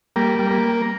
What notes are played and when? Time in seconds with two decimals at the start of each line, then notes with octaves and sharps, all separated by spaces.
0.16 G3 A#3
0.39 G3
0.51 A#3